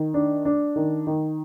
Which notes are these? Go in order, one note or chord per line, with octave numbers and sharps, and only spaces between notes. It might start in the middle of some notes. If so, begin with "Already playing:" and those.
Already playing: D#3
D4
D4
D#3
D#3